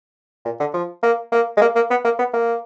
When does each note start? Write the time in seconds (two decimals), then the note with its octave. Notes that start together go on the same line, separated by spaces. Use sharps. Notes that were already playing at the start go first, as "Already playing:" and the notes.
0.45 A#2
0.60 D3
0.74 F3
1.03 A#3
1.32 A#3
1.57 G#3
1.61 A#3
1.76 A#3
1.90 B3
2.04 A#3
2.19 B3
2.33 A#3